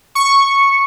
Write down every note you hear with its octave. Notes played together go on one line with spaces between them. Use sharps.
C#6